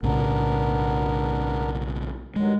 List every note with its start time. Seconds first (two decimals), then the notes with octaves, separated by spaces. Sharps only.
0.03 B1 A2 C#3 B3 D4 A#4
2.36 G2 D#3 F#3 G#3